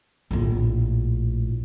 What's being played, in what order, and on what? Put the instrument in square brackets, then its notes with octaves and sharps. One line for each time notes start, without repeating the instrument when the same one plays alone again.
[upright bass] A#1 A2